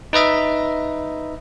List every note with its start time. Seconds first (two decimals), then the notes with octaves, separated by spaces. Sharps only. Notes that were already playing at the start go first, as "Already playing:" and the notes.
0.13 D#4 B4 D#5 E5